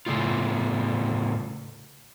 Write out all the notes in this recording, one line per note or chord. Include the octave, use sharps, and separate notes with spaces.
A2 C#3 G#3 A3 F4